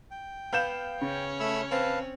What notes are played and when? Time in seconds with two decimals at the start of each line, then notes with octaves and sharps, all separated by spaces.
0.11 G5
0.53 B3 F5 G6 E7
1.01 C#3 C#4 C#5
1.40 A3 B5 E6
1.71 C4 B4 F5 A5